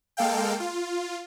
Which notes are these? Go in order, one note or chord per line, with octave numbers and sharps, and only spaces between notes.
G#3 A#3 A4 F5 G5
F4